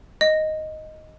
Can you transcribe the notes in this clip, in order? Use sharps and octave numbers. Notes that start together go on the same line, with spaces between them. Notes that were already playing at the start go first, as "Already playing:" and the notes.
D#5